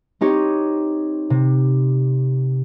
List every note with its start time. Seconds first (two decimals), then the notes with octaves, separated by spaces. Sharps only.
0.21 C4 D#4 G4 C#5
1.30 C3